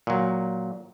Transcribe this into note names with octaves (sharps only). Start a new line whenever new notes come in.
A#2 F#3